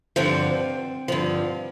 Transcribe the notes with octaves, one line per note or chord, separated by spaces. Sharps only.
G2 D3 F3 C4
G2 D3 F3